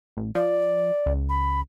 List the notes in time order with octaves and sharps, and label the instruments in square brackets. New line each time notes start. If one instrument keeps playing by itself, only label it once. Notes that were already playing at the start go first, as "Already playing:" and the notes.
[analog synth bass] A1
[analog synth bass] F3 [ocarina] D5
[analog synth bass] C#2
[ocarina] B5